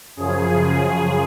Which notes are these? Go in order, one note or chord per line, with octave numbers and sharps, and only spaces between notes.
F#2 C#3 F3 G#4
G#4